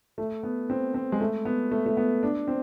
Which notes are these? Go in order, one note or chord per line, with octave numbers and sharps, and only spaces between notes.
A3
B3
C4
C4
G#3
A3
B3
A3
A3
B3
D4
C4